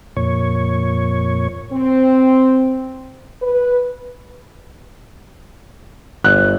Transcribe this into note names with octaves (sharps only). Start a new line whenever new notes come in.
F2 A#2 C#5
C4
B4
G1 F#6